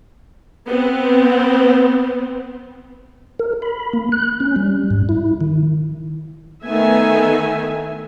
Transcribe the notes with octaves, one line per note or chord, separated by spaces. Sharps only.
B3 C4
A#4
B5
A#3
F#6
C#4
G3
G#2
E4
D#3
D#3 A3 B3 E5 G#5